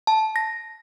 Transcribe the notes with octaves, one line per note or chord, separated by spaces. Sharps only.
A5
A#6